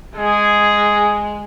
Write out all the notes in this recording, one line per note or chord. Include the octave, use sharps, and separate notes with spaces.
G#3 G#4